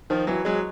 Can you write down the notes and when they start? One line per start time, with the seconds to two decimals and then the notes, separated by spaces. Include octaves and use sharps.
0.10 D#3 F3
0.27 E3 F#3
0.45 F#3 G#3